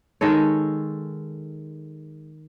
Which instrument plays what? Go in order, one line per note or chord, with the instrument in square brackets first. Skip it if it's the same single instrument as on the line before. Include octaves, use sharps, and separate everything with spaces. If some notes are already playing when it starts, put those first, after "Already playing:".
[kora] D#3 G#3 A4 C#5